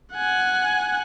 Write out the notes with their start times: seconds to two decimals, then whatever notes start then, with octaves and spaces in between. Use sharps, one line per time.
0.13 F#5 G#5